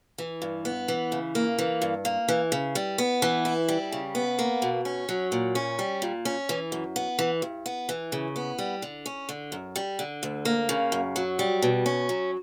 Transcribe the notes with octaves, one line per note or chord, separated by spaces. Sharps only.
E3
G2
B3
E3
C#3
A#3
E3
G2
A#3
E3
C#3
G3
B3
E3
E4
G3
C#3
B3
A#3
B2
C#4
F#3
A#2
C#4
G3
A#2
C#4
E3
F#2
B3
E3
G2
B3
E3
C#3
B3
G3
D3
C#4
D3
F#2
G3
D3
D2
A#3
C#3
F#2
F#3
G3
B2
C#4
F#3